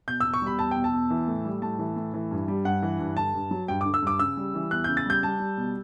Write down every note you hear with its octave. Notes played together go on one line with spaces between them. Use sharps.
B2 G6
E2 E6
C#6
G3 B5
E2 A5
B2 G5
A5
E2
E3
A2
G3
A2 A5
E3
A2
E3
G2
G3
G2 F#5
E3
G2
D3 A5
G2
F#3
G2 G5
D3 D6
E6
G2 D6
C#3 E6
G3
E3
E2 F#6
C#3 G6
A6
G3 G6
G3 A5
G3
B2